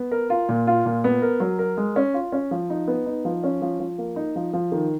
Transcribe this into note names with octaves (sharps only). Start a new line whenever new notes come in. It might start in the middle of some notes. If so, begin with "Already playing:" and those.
Already playing: B3
A#4
F4
A#2
F4
A#2
B3
A#4
F#3
A#4
G#3
C#4
F4
C#4
F3
D#4
B3
D#4
F3
C#4
F3
F3
A#3
D#4
F3
F3
D#3